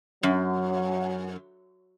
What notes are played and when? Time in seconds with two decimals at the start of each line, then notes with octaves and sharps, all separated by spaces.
0.23 F#2 F#3